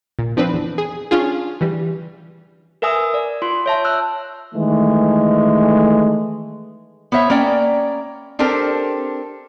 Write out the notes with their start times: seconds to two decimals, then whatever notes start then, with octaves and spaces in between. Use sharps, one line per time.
0.19 A#2
0.37 F3 C4 D4 B4
0.54 E2
0.78 G#4
1.11 C#4 D4 F4 G#4
1.61 E3 G3
2.82 A#4 B4 E5 G#5 D#6 E6
3.14 D5
3.42 F4 C6
3.66 C#5 E5 A5
3.84 E5 E6 F#6
4.55 D#3 E3 G#3 A3
7.12 B3 C5 C#5 E5
7.30 A#3 C#4 D5 G5
8.39 C4 D4 G4 A4 A#4 C5